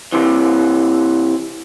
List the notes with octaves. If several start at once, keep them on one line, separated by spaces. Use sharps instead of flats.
C3 E3